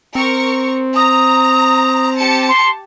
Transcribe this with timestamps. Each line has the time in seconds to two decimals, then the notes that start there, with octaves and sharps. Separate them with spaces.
0.15 C4 A#4 C#6
0.95 A#5 D#6
2.17 G4 A5 C#7
2.48 C6